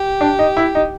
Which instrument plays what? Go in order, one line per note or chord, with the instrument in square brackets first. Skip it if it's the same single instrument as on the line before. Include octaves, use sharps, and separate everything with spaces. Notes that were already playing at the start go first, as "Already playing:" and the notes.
Already playing: [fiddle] G4
[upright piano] D4
D#4
E4
D#4